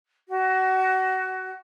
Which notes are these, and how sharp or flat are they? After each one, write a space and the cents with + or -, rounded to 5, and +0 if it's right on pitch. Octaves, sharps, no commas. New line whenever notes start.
F#4 +25